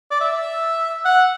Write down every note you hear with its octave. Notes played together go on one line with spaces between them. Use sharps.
D5
E5
F#5